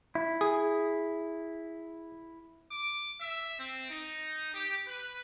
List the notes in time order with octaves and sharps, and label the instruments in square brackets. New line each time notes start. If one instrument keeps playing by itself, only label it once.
[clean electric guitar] E4
[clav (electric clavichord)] G#4
[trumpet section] D6
E5
C4
D#4
G4
B4